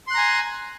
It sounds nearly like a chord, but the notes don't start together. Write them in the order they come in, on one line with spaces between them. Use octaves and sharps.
C6 F#6 A#5 G#5